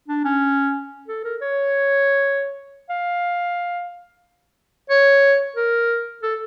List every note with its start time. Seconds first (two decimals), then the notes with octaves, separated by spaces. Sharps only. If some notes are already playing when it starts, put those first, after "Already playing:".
0.08 D4
0.25 C#4
1.08 A4
1.24 A#4
1.41 C#5
2.90 F5
4.90 C#5
5.56 A#4
6.23 A4